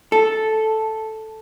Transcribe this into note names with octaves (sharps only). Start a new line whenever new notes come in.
A4